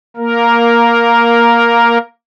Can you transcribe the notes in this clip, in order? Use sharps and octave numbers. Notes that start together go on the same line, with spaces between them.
A#3 A#4